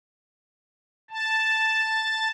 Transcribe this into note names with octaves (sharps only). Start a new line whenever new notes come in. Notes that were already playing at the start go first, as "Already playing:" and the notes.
A5